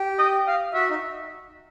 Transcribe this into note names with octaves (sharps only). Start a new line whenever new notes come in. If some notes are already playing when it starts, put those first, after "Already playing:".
Already playing: G4
D#5
F5
F#4 E5
D#4